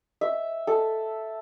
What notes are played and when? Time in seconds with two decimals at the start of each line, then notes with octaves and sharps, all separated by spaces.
0.21 E5
0.67 A4